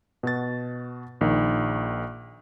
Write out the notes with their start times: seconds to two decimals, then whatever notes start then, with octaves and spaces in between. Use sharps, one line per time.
0.23 B2 F#4 A6
1.21 A#1 D#3